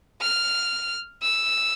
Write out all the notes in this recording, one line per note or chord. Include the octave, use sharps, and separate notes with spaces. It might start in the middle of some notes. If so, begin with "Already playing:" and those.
F6
E6